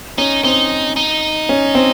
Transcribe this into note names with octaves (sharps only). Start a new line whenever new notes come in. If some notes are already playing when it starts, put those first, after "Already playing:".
C#4 D#4
C4 D#4
D#4
C#4
C4